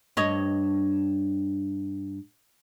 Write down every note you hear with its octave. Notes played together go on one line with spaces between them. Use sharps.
G2 C#5 D#5